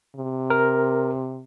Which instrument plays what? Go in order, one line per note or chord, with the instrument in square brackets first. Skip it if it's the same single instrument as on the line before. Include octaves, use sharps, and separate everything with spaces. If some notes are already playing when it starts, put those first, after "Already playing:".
[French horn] C3
[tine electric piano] A#4